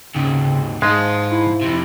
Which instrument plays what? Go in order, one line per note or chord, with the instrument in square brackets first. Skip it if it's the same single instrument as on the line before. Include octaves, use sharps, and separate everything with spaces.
[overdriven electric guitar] D#2 G#2 [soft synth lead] C#3
[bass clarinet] G#2 [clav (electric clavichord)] G#3 [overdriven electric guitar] F5 A5 [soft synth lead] D#6
[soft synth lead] E4
[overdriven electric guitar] F2 C3